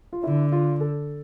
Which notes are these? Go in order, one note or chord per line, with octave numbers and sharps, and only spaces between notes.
F4
D3 E4
F4
A4